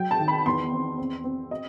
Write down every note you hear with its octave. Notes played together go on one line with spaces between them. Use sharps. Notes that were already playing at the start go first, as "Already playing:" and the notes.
Already playing: F#3 G5
A5
D#3
B5
E2 C6
C4
C4
C4
D#5